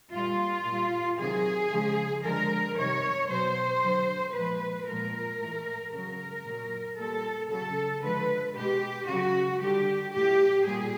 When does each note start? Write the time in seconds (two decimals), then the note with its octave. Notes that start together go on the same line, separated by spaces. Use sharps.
0.14 A#2 G3 F4
0.66 A#2 G3
1.19 C3 D#3 F#3 G#4
1.71 C#3 F3 G#3
2.24 D3 F3 G#3 A#4
2.77 C3 D#3 G3 C#5
3.29 B2 F#3 C5
3.83 D3 F#3
4.34 A#2 F3 G#3 B4
4.87 A#2 F3 G#3 A#4
5.40 A2 E3 G#3
5.93 C#3 F#3 A#4
6.45 A#2 F#3
6.98 A#2 G3 A4
7.50 C#3 F#3 A4
8.03 D3 F3 G#3 B4
8.56 B2 G#3 G4
9.08 C#3 F#3 F#4
9.61 D3 G3 G4
10.14 A2 F#3 G4
10.67 A#2 G3 G#4